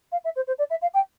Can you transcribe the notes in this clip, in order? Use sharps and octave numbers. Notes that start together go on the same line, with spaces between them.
F5
E5
C5
C5
D5
E5
F5
G5